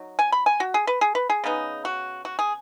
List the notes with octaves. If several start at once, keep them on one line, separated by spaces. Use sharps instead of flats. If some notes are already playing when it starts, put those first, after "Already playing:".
Already playing: F#3 D#4
G#5
B5
G#5
F#4
G#4
B4
G#4
B4
G#4
C#3 B3 D#4
F#4
F#4
G#4